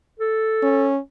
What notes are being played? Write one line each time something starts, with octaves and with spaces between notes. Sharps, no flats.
A4
C#4